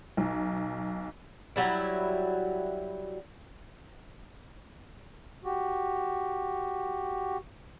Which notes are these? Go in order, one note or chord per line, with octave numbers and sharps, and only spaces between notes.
B1
F#3 G3 E4
F#4 G4